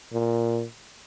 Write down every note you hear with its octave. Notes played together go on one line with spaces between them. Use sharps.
A#2